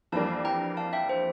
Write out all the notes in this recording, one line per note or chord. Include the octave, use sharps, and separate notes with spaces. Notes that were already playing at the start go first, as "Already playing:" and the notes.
F2 E3 G3 A#3 D4 F5 A5
G5 A#5
F5 A5
E5 G5
C5